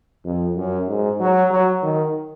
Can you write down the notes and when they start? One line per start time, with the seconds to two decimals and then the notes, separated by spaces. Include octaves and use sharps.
0.25 F2
0.56 F#2
0.88 G#2
1.20 F#3
1.51 F#3
1.83 D#3